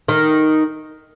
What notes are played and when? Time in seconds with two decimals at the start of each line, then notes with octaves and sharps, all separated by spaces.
0.08 D#3